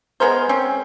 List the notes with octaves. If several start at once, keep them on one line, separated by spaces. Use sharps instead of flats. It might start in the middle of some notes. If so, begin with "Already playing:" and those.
G#3 B3 A#4 C5
C4 C#4